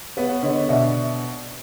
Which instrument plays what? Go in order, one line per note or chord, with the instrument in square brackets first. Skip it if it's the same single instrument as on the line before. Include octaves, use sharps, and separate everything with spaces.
[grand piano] B3 [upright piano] B4 C#5
[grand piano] D3 [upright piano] C#5 D#5
[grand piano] B2 [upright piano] D5 E5